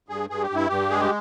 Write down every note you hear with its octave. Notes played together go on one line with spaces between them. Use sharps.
G2 G#4
G2 G#4
G4
G2 E4
G2 G4
G#3 G#4
G4